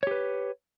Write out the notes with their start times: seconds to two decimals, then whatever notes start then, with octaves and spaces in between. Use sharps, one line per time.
0.03 C#5
0.07 G4
0.11 B4